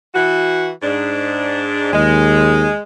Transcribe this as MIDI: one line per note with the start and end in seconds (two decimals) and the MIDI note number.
0.14 0.69 52
0.14 0.69 66
0.81 1.91 44
0.81 1.91 62
1.93 2.68 39
1.93 2.82 56